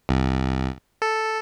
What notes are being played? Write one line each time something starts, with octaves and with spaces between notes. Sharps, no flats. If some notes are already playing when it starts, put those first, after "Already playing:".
C2
A4